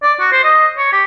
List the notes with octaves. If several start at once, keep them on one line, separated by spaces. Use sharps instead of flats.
D5
F#4
C5
D#5
C#5
G4